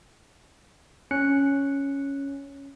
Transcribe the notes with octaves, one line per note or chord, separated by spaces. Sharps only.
C#4 F#6 C#7